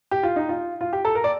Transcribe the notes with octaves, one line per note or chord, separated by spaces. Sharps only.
G4
F4
D#4
F4
F4
G4
A4
A#4
D5